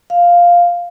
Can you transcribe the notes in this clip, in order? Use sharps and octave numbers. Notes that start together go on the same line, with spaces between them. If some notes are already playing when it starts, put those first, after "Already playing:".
F5